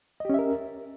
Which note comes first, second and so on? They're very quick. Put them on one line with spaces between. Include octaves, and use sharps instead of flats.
D#5 G4 C#4 E5 A#4